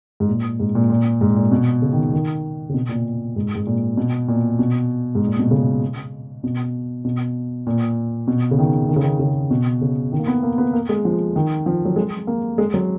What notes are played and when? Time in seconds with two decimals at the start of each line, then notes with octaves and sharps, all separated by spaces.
0.20 G#2
0.29 A#2
0.60 G#2
0.75 A#2
0.90 A#2
1.21 G#2
1.36 A#2
1.52 B2
1.82 C#3
1.93 D#3
2.13 D#3
2.69 C#3
2.74 B2
2.89 A#2
3.36 G#2
3.55 G#2
3.67 A#2
3.97 B2
4.28 A#2
4.59 B2
5.15 G#2
5.27 A#2
5.39 B2
5.51 C#3
6.44 B2
7.05 B2
7.67 A#2
8.27 B2
8.51 C#3
8.59 D#3
8.89 D#3
8.96 C#3
9.03 D#3
9.19 C#3
9.51 B2
9.81 C#3
10.12 D#3
10.20 A#3
10.27 B3
10.43 A#3
10.58 B3
10.73 A#3
10.89 G#3
11.05 F3
11.36 D#3
11.66 F3
11.85 F#3
11.96 G#3
12.27 A#3
12.58 G#3
12.74 F#3